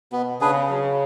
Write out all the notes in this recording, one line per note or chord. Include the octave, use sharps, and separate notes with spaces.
B2 B3
C#3 D4 G#4 B4
F#3